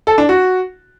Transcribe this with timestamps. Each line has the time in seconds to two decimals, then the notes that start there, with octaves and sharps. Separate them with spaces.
0.07 A4
0.18 D4
0.29 F#4